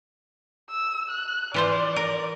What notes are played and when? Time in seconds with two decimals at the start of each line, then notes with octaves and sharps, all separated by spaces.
0.70 E6
1.10 F#6
1.54 E3 F4 C5 D5
1.96 A#4